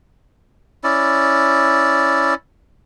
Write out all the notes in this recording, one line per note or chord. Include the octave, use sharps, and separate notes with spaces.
C#4 E4 D5